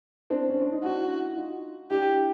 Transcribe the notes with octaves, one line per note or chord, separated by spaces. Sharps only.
C4 D4
C#4
D4
D#4
D4 E4 F#4
D#4 F4
D4 E4 G4